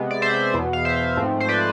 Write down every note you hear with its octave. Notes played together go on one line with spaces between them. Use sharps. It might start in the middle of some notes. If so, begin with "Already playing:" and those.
Already playing: C3 G#3 B3
D5
C5 E5
E2 B2 B3
F5
C5 E5
G#2 F3 A3 C4
C5
B4 D5